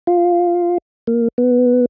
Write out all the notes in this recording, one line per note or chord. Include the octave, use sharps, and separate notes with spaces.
F4
A#3
B3